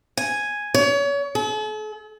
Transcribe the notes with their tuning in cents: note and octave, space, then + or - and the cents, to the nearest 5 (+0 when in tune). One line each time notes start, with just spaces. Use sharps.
G#5 +0
C#5 +35
A4 -45